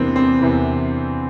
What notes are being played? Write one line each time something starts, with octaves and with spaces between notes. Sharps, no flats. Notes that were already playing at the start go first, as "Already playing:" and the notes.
Already playing: E2 C3 E3 A#3 C4 D4
C4
E2 C3 E3